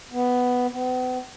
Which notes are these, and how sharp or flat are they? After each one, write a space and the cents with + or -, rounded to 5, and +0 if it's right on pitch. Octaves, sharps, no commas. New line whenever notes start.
B3 +5
B3 +40